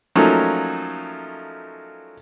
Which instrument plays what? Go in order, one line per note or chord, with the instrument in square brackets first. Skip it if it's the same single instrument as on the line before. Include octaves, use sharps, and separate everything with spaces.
[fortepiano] F3 F#3 A3 A#3 C#4 D#4